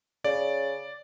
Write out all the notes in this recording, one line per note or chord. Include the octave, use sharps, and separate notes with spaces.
C#3 D5